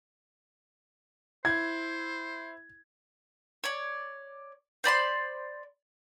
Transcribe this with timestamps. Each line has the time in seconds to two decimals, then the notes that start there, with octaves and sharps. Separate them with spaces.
1.45 E4 C5 G#6
3.64 C#5 D5
4.84 C5 D5 B5 C6